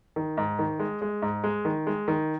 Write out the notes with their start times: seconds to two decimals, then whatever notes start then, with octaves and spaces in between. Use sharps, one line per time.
0.16 D#3
0.37 G#2
0.59 D#3
0.79 G#3
1.02 G#3
1.22 G#2
1.44 G#3
1.65 D#3
1.87 G#3
2.08 D#3